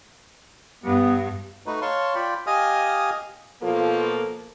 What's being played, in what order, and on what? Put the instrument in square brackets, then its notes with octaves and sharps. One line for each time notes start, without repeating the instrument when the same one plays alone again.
[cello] G2 [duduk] B3
[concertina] A3 D#4 F#4 B4
C#5 F5 A5 C6 C#6
F4 D5 G5 B5
G4 D#5 F5 G#5 D#6 F6
[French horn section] B2 F3 A#3 F4 A4